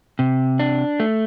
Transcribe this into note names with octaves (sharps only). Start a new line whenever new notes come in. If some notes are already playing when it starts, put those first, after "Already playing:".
C3
D4
A3